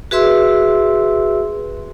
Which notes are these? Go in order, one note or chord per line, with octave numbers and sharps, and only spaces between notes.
F#4 G#4 B4 E5 C6 E6